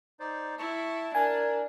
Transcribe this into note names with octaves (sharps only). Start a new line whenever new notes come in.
D#4 C5 D5
E4 A5 C#6
D4 A#4 G#5